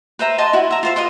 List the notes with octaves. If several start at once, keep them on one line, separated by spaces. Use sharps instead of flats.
B4 C5 E5 A#5
D#5 G#5 A5 C6
E4 F#4 B5
E5 A#5
F4 C5 E5
F4 B4 D#5 C6